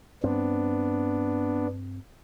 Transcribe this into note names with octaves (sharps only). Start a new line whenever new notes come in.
G2 B3 C4 D4